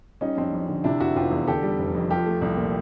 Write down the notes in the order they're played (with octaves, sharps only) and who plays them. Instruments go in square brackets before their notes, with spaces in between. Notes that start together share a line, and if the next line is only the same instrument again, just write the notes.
[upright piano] G3 C#4 D#4
F2 C4 D4
F2
D3
C3 D4 E4
F1 E4 F#4
F1 F4 G4
E2
D3 G4 A4
G3
F1
F2
F3 G4 A4
A3
C2
A#2